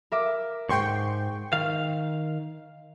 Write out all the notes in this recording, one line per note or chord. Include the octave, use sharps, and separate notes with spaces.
A#4 E5 D6
C#2 G#2 G5 C6 C#6
D#3 F5